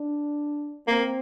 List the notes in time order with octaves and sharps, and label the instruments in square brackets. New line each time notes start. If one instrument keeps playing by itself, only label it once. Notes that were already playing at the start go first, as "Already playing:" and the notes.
Already playing: [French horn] D4
[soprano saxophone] A#3 [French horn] C4